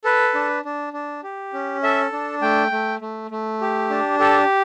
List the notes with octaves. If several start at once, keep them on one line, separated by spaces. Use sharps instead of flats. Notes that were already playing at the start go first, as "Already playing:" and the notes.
A4 B4
D4
D4
D4
G4
C#4
A4 E5
D4
A3 G5
A3
A3
A3
G4
D4
G4 A4